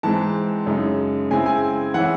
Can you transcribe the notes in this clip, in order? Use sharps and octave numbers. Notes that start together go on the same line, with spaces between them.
G#2 E3 G#3 C4 A5
F#2 C#3 G#3 D#4
C#3 G#3 C4 E4 G#5
G#5
E3 G#3 C#4 E4 F#5